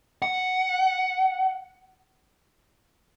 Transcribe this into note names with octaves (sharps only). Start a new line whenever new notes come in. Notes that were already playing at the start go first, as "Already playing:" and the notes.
F#5